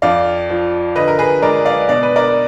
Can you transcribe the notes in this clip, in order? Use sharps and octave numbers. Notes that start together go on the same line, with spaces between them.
F2 D5 F5
F3
D3 B4 D#5
A#4
G#4 B4
G#3 A#4 D5
D5 F5
B2 D5
B4
A#4 D5